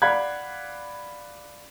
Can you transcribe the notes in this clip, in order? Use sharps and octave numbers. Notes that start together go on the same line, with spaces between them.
D5 F5 F#5 B5 F#6 G#6